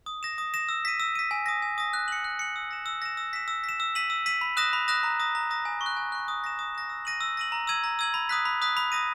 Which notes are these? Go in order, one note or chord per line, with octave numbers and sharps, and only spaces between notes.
D#6
A#6 E7
D#6
A#6 E7
E6
B6 D#7
E6
B6 D#7
G#5
D#6 A#6
G#5
D#6 A#6
F#6
C#7 F#7
F#6
C#7 F#7
E6
A#6 E7
E6
A#6 E7
E6
B6 E7
E6
B6 E7
E6
B6 D#7 F#7
E6
B6 D#7 F#7
B5
D#6 F#6 A#6 E7
B5
D#6 F#6 A#6 E7
A#5
D#6 A#6
A#5
D#6 A#6
G#5
C#6
F#6
G#5
C#6 F#6
D#6
A#6 E7
D#6
A#6 E7
E6
A#6 D#7 F#7
E6
A#6 D#7 F#7
A#5
E6 G#6 D#7 F#7
A#5
E6 G#6 D#7 F#7
B5
D#6 F#6 B6
B5
D#6 F#6 B6
B5
D#6 A#6 D#7